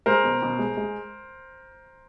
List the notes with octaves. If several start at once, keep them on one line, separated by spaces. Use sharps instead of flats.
G#3 A#4 C5
B2
B2
G#3
G#3